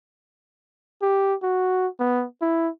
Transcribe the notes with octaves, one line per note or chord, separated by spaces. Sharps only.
G4
F#4
B3
E4